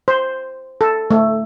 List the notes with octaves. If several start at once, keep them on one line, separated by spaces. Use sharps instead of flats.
C5
A4
A3